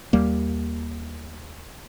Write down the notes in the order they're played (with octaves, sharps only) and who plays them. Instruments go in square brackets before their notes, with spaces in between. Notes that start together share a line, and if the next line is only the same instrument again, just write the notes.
[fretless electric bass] D#2 G3 A#3